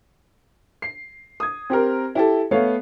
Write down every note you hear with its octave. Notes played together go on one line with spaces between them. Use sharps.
C7
D#6 G#6
C4 G4 A#4
E4 G4 A4
A3 B3 C#5 F5